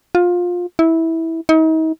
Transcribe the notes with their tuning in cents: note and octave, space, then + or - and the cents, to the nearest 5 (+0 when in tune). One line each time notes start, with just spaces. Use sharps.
F4 +20
E4 -15
D#4 +40